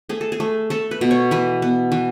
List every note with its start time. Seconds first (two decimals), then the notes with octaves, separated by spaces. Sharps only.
0.09 A3 G#4
0.21 A4
0.32 G#4
0.40 A3
0.70 A3 A4
0.91 B4
1.01 B2
1.11 C#5
1.31 E3 B4
1.62 B3
1.92 E3